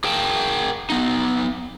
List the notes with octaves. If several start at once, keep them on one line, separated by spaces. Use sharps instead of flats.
G#4 A#4 G5 A5
B3 D#4